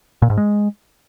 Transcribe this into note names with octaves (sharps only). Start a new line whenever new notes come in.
A#2
G#2
G#3